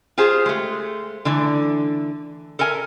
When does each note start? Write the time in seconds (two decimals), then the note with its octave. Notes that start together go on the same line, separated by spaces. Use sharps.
0.18 F4 G4 G#4 C5
0.46 G#3 A3
1.25 D3 E3 A3
2.59 A4 A#4 E5 G#5